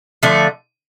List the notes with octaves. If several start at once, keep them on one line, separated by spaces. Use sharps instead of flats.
D3 F3 A3